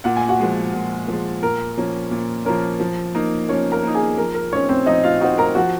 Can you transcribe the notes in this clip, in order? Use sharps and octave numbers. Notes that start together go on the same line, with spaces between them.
A#2 F#5
G#5
F#4 F#5
F3 G#3
A#2
F3 G#3
A#2 A#4
F3 A#3 C#4
A#2
F3 A#3 C#4 A#4
F3
A#3 D#4
F3 C#4 C#5
A#4 A#5
A#3 D#4
G#4 G#5
F3 A#4
A#4
C4 C#4 D#4 C#5
C4 C5
F3 D#4 D#5
F4 F5
C4 D#4 F#4 F#5
A#4 A#5
F3 F#4 F#5